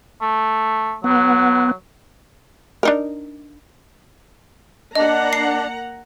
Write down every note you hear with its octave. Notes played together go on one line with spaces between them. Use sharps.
A3
F#3 B3
D4 D#4 A#4
A#3 D4 D#5 F#5 A#5
C7